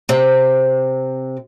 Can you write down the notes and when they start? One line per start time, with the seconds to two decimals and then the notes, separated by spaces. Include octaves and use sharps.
0.09 C3 C4